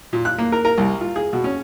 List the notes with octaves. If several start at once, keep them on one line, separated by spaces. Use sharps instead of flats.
A#2
F#6
A#3
A#4
A#4
C2
F4
G#4
B2
C#4